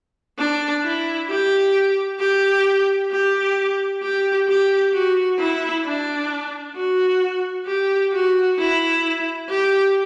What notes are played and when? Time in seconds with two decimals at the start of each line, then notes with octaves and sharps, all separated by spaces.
0.39 D4
0.84 E4
1.29 G4
2.20 G4
3.12 G4
4.03 G4
4.48 G4
4.93 F#4
5.39 E4
5.85 D4
6.76 F#4
7.67 G4
8.13 F#4
8.58 E4
9.49 G4